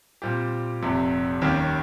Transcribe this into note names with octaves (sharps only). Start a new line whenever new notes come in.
A#2 G3 C4 G4
F1 F2 C3
D#2 D#3 G3 C#4 G4